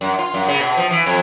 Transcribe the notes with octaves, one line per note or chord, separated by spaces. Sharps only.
F#2
F4
F#2
C#3
B2
F3
E3
F2